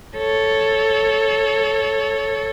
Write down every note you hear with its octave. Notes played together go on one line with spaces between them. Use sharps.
A4 C#5